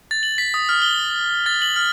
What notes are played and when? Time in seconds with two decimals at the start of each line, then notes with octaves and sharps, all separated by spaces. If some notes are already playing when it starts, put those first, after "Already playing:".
0.11 A6
0.23 F#7
0.38 B6
0.54 D#6
0.69 F6
0.82 G7
1.46 A6
1.62 F#7
1.76 F6